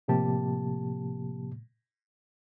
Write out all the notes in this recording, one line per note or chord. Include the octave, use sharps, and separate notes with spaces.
A2 C3 F3 A#3 G4 A5